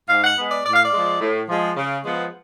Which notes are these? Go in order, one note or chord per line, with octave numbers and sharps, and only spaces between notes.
G#2 F5
F#5
G#3 B3
D5
A2 D5
F5
D5
F3 G#3
A2
F3 G#3
C#3
F3 G#3 B3